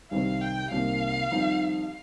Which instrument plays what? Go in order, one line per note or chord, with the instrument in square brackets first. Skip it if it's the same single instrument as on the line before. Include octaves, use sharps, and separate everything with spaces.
[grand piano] C2 C3 D#3 G3 C4 [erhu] F5
[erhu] G5
[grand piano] C2 C3 D#3 A#3 [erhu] F5
[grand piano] F2 D#3 G3 C4 D#4